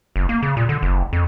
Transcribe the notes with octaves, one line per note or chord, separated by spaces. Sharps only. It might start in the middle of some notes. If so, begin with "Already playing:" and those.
F#1
A#3
C#3
A#2
D3
F#1
F2